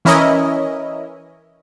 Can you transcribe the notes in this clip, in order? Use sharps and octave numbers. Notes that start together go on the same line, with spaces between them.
E3 C#4 E4 A#4 C#5 D#5